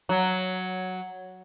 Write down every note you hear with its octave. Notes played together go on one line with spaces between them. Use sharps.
F#3